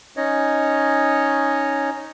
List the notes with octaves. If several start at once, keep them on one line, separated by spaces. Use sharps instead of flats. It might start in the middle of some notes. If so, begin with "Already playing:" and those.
C#4 D#4 C#5 D#5